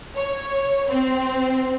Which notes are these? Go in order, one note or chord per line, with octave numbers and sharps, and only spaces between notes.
C#5
C4